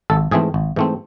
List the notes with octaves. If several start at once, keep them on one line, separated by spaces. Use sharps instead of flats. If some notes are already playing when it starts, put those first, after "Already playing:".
G#1 A4
G#2 E3 A3 C4 G#4
G#1
G#2 E3 A3 C4